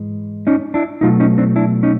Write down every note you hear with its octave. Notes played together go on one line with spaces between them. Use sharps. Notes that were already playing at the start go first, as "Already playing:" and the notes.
Already playing: G#2 E3 G#3
C#4 D#4
D4 E4
B2 F#3 A3 D#4 F4
C#4 D#4
C4 D4
D4 E4
C#4 D#4